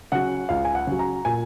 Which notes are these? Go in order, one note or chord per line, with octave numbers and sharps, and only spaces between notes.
C#3 F#3 F#5
C#2 F5
G#5
F#5
C#3 F#3
A#5
A#2 G#5